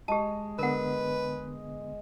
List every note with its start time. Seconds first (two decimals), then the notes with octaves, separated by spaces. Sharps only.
0.08 G#3 G4 A5
0.59 D3 B3 A#4 B4 F#5